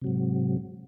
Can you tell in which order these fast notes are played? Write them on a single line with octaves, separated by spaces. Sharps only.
C3 F#3 G#2